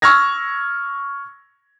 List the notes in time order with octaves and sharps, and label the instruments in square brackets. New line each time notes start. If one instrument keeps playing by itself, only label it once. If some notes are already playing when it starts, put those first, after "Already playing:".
[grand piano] C#6 E6 F6 G#6 A#6